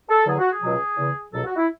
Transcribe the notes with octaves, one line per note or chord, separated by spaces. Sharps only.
A4
E2 D3 F#3 G#4
F#4
G#4
C#2 B2 F#3
E2 C#3 E3
C#2 B2 F#3 A4
F#4
E4